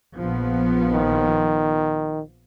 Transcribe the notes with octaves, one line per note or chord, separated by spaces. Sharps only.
A#1 F3 B3
D#3